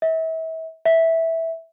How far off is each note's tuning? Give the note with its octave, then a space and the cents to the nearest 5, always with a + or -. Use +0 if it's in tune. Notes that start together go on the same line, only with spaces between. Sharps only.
E5 -35
E5 -10